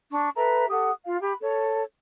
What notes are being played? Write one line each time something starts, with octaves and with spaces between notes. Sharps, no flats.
D4 C#6
A4 B4 E5 A#5
G4 A4 F#5 D#6
F4 F5
G4 B5
A4 C#5